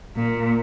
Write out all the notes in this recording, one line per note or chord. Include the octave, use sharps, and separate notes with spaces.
A#2